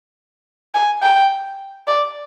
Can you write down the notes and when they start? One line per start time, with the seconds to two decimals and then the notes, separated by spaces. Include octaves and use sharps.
0.75 G#5
1.02 G5
1.87 D5